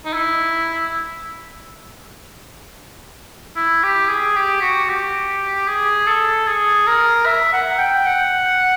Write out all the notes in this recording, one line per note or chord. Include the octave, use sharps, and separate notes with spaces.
D#4
E4
E4
G4
G#4
G4
F#4
G4
G#4
A4
G#4
A#4
E5
F#5
G5
F#5